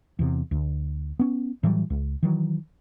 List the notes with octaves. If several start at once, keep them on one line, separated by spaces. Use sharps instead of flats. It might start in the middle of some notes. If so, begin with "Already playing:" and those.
E2 C3
D2
B3 C#4
A2 E3 F#3 G3
C#2
D#3 E3 F#3